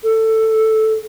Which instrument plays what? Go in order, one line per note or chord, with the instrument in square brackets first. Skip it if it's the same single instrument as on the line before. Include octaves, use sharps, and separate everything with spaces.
[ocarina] A4